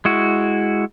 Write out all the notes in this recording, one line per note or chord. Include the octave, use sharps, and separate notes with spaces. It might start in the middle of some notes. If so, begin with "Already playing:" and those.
G#3 E4 F#4